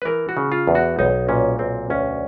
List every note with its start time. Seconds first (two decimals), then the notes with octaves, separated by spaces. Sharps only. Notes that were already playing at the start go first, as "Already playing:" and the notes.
0.02 B4
0.05 E3 A#4
0.29 F#4
0.37 C#3
0.52 F4
0.67 E2
0.75 F#4
0.99 B1 D#4
1.29 A#2 C#4
1.59 B1 C4
1.90 D2 C#4